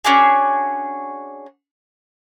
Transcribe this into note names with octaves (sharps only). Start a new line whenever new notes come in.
C#4 D4 F#4 G#4